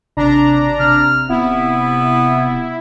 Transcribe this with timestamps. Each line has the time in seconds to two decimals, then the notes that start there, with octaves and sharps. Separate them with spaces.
0.17 G#1 C3 D4 A#5
0.80 C3 F6
1.29 D1 B3 E4